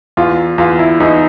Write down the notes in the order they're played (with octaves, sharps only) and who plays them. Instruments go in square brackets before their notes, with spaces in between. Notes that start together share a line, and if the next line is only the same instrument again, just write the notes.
[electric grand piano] E2 [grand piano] F4
[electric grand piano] E2 [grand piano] F4
[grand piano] E4
[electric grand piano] E2 [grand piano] D#4